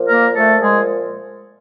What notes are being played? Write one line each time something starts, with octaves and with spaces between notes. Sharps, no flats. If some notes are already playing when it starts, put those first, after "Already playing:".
Already playing: A#2 F3
A#3 A#4
A#2 F3 A3 A4
G#3 G#4